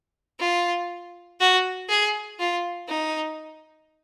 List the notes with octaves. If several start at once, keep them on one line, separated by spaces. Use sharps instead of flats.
F4
F#4
G#4
F4
D#4